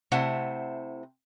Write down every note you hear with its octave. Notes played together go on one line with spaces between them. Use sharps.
C3 A3 E4 C5 F#5